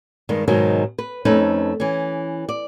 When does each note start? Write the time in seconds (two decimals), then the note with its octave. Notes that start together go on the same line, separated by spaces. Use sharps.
0.29 G2 D#3 G#3
0.48 G#2 B2 D#3 F#3 G#3 D#4
0.98 B4
1.25 F2 A3 C#4 D#4 B4
1.80 E3 C#4
2.49 D5